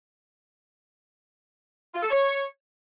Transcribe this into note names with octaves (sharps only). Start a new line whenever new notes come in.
F4
A4
C#5